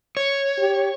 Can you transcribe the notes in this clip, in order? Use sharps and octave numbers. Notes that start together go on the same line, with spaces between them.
C#5
G4